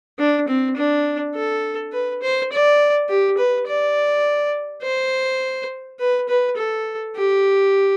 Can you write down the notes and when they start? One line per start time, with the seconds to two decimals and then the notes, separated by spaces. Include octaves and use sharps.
0.19 D4
0.48 C4
0.77 D4
1.36 A4
1.93 B4
2.22 C5
2.52 D5
3.09 G4
3.38 B4
3.67 D5
4.83 C5
5.99 B4
6.29 B4
6.57 A4
7.16 G4